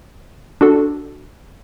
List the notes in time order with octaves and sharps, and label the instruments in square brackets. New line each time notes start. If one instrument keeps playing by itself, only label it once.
[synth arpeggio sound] D4 F#4 A4